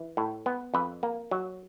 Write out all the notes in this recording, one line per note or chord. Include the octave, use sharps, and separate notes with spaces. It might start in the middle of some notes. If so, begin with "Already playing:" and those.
Already playing: E3
A2
B3
F2 B4
A#3
F#3